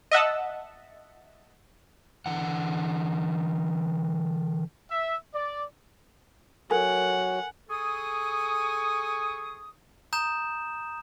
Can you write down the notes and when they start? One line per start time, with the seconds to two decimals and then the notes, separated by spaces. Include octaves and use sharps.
0.11 D#5 E5 F#5 A5
2.26 D3 E3 F#5
4.91 E5
5.34 D5
6.71 F#3 F#4 A4 A#4 F#5 G#5
7.69 G#4 A4 G#5 C#6 D#6
10.13 A#5 D#6 G6 E7